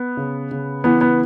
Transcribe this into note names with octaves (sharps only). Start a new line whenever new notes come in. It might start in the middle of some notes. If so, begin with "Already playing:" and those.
Already playing: B3
C#3
C#3
E3 B3
B3